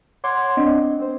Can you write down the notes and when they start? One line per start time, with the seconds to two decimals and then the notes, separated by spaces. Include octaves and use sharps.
0.24 C#5 F#5 C6 D6 G#6
0.57 C4 D4 D#5
0.99 C4 C5